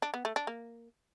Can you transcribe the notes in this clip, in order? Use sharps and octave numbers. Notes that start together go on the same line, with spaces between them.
D4
B3
A3
D4
A#3